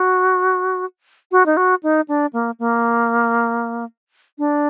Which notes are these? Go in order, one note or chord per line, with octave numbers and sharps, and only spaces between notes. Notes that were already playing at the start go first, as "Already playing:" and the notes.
Already playing: F#4
F#4
D#4
F#4
D#4
D4
A#3
A#3
D4